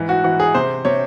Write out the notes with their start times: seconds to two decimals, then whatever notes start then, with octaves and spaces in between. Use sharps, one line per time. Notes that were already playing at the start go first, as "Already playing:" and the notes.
Already playing: G#2 E3
0.09 F#4
0.24 E3 F#4
0.40 G#4
0.55 C3 C5
0.85 C3 C#5